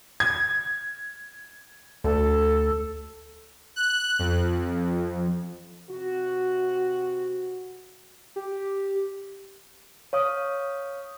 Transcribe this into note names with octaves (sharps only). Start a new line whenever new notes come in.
G#6
D2 A4
F#6
F2
C3 F#4
G4
C#5 F5 D#6